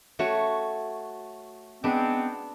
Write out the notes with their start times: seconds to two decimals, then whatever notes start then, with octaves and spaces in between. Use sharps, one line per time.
0.19 A3 F#4 C#5
1.84 G#3 B3 C4 D4 B4